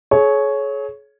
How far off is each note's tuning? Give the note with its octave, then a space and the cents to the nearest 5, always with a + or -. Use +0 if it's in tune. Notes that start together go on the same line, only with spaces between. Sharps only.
G#4 +40 C#5 +0